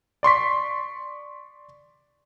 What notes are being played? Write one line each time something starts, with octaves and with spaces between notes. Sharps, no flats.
D5 C6 C#6 B6